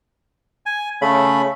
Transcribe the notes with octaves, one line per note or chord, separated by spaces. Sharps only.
G#5
C#3 A3 B5